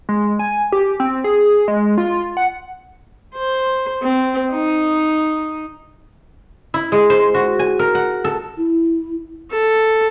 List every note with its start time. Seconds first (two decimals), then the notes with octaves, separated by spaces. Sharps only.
0.09 G#3
0.39 G#5
0.72 G4
1.00 C4
1.24 G#4
1.68 G#3
1.98 F4
2.37 F#5
3.35 C5
4.03 C4
4.51 D#4
6.74 E4
6.92 G#3
7.10 C5
7.34 F#4
7.59 G#5
7.79 A#4
7.95 F#5
8.24 A4
8.57 E4
9.51 A4